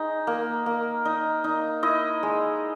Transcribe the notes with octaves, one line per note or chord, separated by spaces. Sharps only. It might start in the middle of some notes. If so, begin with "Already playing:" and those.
Already playing: G#3 D#4
A#3
A#3
D#4
D#4
E4 D#5
G#3